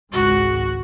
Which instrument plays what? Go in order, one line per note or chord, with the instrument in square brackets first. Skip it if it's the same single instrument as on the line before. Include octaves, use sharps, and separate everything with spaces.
[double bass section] G#1 C#2 G#2 [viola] F#4